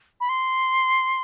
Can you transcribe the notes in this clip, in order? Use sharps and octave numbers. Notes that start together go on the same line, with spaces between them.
B5
C6